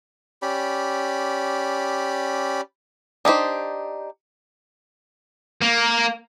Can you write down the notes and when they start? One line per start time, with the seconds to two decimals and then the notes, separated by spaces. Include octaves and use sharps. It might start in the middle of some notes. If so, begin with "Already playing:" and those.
0.42 C#4 G4 D5 B5
3.25 D4 D#4 G4 C5
5.62 A#3